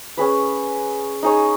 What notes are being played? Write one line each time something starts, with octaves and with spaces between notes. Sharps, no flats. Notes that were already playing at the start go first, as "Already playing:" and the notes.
C#4 G#4 B4
D#4 G#4 C#5